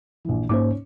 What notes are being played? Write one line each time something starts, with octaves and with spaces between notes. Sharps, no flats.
A#1 E3
G#2 A#3 C#4 D#4 C5 D6